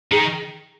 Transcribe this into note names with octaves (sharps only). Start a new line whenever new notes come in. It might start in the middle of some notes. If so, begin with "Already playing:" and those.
D#3 G#4